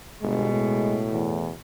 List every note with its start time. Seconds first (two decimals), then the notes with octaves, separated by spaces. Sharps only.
0.23 G1 B2 G#3
0.53 A2
1.12 E2